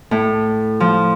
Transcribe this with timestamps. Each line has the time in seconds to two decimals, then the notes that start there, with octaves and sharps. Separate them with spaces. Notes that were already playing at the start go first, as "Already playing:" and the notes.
0.11 A2
0.80 F3